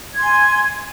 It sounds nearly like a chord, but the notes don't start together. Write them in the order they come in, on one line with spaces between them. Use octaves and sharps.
G#6 C6 G#5